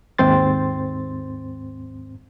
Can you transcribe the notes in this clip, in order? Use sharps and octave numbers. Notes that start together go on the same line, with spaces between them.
D#2 G#2 C4 C6 A6